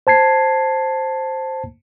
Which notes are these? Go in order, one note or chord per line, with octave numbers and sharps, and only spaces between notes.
C5 A5 G#6 C7